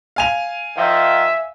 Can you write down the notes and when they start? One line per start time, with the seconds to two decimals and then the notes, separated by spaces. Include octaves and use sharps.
0.16 F5 G#5 F7
0.77 D#3 F3 E5